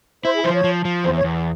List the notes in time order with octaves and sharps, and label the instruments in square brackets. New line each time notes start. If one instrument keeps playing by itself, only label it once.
[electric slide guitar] E4 [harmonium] C5
[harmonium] G#4
[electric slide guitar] F3 [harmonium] C5
[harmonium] C#5
[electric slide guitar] F3
F3
[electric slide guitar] E2 [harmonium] C5
[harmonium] C#5
[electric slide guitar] E2